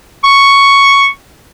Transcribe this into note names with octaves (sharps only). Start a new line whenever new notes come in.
C#6